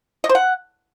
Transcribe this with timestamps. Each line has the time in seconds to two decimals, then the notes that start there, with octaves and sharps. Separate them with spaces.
0.24 D#5
0.29 C5
0.35 F#5